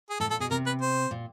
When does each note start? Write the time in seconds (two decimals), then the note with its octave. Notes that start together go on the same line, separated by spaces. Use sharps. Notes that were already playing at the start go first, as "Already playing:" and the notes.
0.10 G#4
0.20 A2 A4
0.30 A#2 A4
0.40 B2 G#4
0.51 C3 A#4
0.66 B4
0.81 C5
1.11 A#2